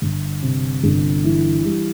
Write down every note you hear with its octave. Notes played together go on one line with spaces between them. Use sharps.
G1
C3
G1
E3
G3